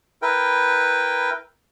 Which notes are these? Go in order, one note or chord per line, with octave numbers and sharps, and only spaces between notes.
E4 A#4 B4 G5